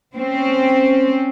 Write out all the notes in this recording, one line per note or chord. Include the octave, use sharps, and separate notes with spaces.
C4 C#4